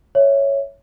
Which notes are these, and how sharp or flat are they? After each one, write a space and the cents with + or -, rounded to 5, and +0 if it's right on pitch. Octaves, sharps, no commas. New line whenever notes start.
C#5 +0 E5 +0